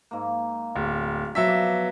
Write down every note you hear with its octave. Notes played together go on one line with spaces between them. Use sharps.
G#2 A#3
D1
B2 F3 F#3 E5 B6
D5